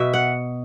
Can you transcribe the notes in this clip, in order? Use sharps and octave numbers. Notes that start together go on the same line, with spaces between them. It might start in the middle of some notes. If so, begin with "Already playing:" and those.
Already playing: B2 E5
F#5